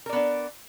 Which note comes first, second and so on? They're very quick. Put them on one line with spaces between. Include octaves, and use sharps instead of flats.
A#4 D5 B3 D4